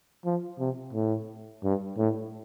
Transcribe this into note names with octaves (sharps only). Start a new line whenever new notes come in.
F3
C3
A2
G2
A2